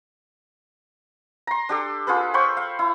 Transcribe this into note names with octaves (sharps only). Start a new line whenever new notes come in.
A#5 C6
D4 G4 A4
F4 G#4 A4 B4
C5 G5 B5 C#6
F5
E4